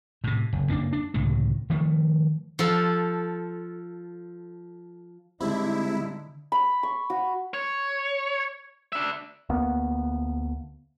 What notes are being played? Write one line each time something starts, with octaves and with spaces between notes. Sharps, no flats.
A2 C3
F#1
F#1 A#3 C4 D4
D4
C#2 A2 C3 D#3
D#3 F3 A3
F3 A4
D3 G3 G#3 C4 D#4 E4
B5
C#6
F#4
C#5
D4 E5
D2 A#3 B3